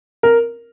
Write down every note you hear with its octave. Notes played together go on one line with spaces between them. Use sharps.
A#4